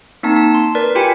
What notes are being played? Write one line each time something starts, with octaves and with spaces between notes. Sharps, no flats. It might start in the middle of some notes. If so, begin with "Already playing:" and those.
A#3 C4 D#4 A5
A5
C6
A#4 B4 D5
F4 G4 G5 G#5 B5 C#7